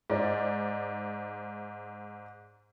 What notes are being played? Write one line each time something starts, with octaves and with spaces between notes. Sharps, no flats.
G#2 D5